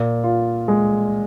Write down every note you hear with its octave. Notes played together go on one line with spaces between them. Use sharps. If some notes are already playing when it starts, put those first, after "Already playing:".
Already playing: A#2
F4
G#3